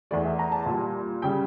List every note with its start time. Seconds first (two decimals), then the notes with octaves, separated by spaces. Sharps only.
0.11 E2 E3 A3 D5
0.25 E5
0.39 A#5
0.52 A5
0.66 A#2 G3
1.22 C#3 G3 G5